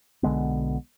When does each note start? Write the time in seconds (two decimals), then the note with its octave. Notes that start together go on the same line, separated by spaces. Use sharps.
0.23 B1 D3 G#3 B3